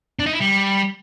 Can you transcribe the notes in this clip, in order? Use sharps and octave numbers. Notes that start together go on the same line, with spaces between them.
D4
D#4
E4
G3